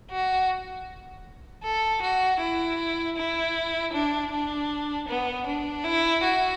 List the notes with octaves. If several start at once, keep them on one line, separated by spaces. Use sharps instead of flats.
F#4
A4
F#4
E4
E4
D4
D4
B3
D4
E4
F#4